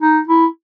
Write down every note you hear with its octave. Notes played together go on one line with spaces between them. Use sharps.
D#4
E4